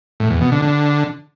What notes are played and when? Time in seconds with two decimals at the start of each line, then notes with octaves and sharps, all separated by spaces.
0.20 A2
0.30 E2
0.41 B2
0.52 D3
0.62 D3